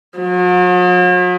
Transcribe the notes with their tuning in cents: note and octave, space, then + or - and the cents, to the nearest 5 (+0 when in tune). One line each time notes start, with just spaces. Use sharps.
F#3 -45